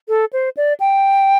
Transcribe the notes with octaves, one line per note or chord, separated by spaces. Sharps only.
A4
C5
D5
G5